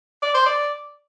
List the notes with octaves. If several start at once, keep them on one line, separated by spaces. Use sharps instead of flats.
D5
C5
D5